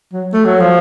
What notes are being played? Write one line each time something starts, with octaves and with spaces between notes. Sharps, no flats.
F#3
A3
F#3
F3